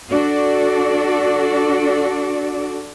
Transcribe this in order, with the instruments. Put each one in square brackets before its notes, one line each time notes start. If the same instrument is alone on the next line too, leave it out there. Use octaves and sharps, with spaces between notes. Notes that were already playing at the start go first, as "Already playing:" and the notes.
[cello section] D4 F#4 A4 D5